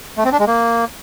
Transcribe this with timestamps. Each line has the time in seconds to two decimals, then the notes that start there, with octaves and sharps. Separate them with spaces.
0.17 A3
0.25 C4
0.32 D4
0.40 G#3
0.47 A#3